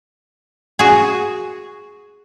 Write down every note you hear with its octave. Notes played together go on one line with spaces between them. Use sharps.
F#4 G#4